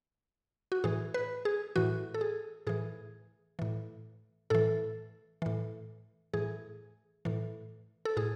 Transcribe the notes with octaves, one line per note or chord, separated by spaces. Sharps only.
F#4
A2 E3 G#4
B4
G#4
A2 E3 F#4
A4
G#4
A2 E3 G#4
A2 E3
A2 E3 A4
A2 E3
A2 E3 G#4
A2 E3
A4
A2 G#4